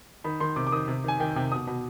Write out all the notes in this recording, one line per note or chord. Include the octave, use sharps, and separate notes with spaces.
D#3 B5
D#3 C6
C3 D6
D6
D#3 D#6
C3
D#3 G#5
D#3 G5
C3 G5
B2 D#6
B2